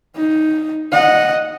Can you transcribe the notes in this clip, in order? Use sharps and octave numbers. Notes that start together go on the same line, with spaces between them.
D#4
D#5 F#5